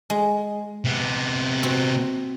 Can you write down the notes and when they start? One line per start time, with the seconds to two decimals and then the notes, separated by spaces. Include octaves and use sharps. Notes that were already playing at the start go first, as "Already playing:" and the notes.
0.10 G#3
0.85 C3 B3
1.63 C4 F#4